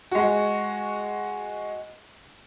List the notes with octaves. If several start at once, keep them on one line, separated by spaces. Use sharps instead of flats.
G#3 F#4